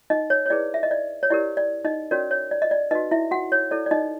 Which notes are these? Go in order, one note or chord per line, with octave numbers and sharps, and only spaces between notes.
D#4 D#5
C#5
C#5
E4 G#4 B4 D5
E5
D#5
D5
C#5
E4 G4 A#4 D5
D5
D#4 D#5
C#4 F#4 A#4 C#5 D5
C#5
D5
D#5
D5
D#4 F#4 B4 D#5
E4 E5
F#4 F#5
C#5
E4 A4 C#5 D5
D5
D#4 D#5